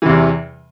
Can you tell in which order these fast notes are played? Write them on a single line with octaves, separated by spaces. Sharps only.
E3 C3 E2